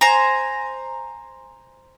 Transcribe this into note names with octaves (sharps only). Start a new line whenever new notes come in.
C5 G#5 A#5